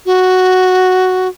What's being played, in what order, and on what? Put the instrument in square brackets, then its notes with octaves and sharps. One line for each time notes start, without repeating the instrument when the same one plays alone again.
[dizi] F#4